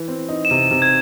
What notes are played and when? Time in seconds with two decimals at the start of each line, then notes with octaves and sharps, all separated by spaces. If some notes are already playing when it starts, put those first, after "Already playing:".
Already playing: E3
0.08 C4
0.29 D#4
0.45 E7
0.50 C3 D#7
0.71 C3
0.82 G#6